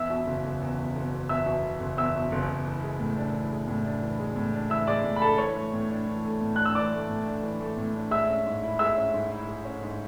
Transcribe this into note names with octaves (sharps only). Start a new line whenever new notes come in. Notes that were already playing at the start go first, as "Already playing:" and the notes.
Already playing: E2 E5 E6
B2
F#1
F#1
E2
B2
F#1
F#1
E2 E5 E6
B2
F#1
F#1
E2 E5 E6
B2
F#1
F#1
E3
G#3
A2
D4
E3
G#3
A2
D4
E3
G#3
A2
D4
E3 E5 E6
G#3 D5 D6
A2
B5
D4 A4 A5
E3 C#5 C#6
A3
A2
D4
E3
A3
A2
D4 F#6
E6
E3 D5 D6
A3
A2
D4
E3
A3
A2
D4
G#3 E5 E6
C#4
G#2
E4
G#3 E5 E6
C#4
G#2
E4
G#3
C#4
G#2